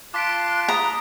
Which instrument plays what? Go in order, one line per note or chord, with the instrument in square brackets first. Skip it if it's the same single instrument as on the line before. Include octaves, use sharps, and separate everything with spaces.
[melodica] F4 A5 C6 [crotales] D6 B6 D7 [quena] F#6
[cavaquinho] A#5 [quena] D#6